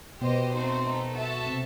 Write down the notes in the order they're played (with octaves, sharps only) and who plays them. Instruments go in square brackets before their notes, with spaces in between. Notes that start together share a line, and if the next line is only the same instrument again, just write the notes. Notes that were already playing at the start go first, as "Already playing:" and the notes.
[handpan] B2 B3 [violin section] G4 C5 D#5
[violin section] A3 C4 D#4 F#4 C5
A3 D#4 A4
F#4 A4 E5 A5
[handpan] C3 C4